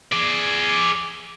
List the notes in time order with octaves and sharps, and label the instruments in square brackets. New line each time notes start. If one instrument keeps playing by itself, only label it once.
[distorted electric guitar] G#4 D5